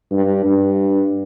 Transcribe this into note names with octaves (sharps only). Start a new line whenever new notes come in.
G2
G2